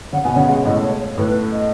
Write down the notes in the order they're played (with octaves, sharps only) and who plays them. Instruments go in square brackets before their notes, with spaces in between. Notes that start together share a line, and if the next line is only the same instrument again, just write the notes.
[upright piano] C#3 C#4 [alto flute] F#5
[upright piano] B2 B3 [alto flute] G#5
[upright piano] C#3 C#4 [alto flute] F#5
[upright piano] G#3 [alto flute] F#5
[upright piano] A2 A3 [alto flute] D#5
[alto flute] C#5
C#5
[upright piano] A2 A3 [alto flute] B4
[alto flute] D#5